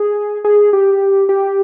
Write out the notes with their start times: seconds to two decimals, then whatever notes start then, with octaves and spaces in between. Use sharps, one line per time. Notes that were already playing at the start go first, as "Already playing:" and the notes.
Already playing: G#4
0.44 G#4
0.73 G4
1.29 G4